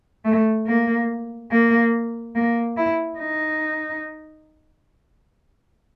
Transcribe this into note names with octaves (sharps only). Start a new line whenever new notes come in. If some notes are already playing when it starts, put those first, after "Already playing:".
A3
A#3
A#3
A#3
E4
D#4